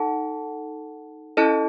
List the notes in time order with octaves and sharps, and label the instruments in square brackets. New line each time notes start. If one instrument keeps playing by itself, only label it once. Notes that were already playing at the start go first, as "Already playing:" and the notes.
Already playing: [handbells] D#4 A4 F#5 A5
C#4 E4 A4 D#5 A5